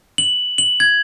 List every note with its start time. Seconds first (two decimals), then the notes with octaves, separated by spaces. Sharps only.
0.18 F#7
0.58 F#7
0.80 G#6